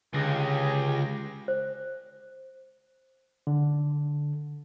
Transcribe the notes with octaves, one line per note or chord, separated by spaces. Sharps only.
C#2 D3 G4 G#4 A#6
C5
D3